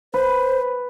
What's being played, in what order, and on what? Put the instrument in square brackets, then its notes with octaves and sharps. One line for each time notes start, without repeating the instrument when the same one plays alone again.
[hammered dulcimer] B4 [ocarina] C5